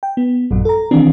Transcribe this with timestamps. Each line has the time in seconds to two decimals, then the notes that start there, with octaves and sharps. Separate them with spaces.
0.03 G5
0.17 B3
0.51 A1 F#2 A#2 F#3
0.65 A4 A#5
0.91 D#3 E3 C4 D4